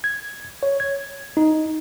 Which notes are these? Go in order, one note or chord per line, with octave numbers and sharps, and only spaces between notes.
G#6
C#5
G#6
D#4